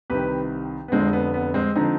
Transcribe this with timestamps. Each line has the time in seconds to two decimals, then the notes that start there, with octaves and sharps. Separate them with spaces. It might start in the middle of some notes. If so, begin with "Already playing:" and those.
0.10 C2 C3 D#3 G4 B4
0.88 B3
0.92 F1 F2 D3 G#3 C4
1.13 B3
1.34 B3
1.54 G#3 C4
1.75 D3 F3 C4 D#4